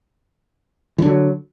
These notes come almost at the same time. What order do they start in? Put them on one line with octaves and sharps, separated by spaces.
E3 D3 F#3